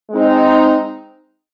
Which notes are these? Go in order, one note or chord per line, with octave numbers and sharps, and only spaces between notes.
G#3 C4 D#4